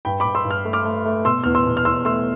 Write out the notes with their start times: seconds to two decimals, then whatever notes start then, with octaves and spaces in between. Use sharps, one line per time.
0.05 G2 G5 B5
0.20 G2 B5 D6
0.35 C6 E6
0.45 G2
0.51 F6
0.65 A3
0.73 D6 F6
0.85 A3
1.05 A3
1.25 B2 C6 E6
1.44 E2 F6
1.55 C6 E6
1.66 B2
1.77 F6
1.85 E2 C6 E6
2.05 A3 C6 E6